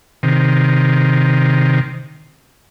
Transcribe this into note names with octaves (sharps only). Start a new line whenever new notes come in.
C3 D#3